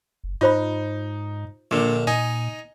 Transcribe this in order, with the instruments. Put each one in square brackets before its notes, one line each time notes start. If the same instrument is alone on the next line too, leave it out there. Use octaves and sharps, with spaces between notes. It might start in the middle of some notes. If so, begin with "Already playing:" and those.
[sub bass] F#1
[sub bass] G#2 [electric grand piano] D#4 [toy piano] F4 C5 B5
[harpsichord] A#1 D3 [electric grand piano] A#2
[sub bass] A#2 [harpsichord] D#4 [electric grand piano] D#5 G#5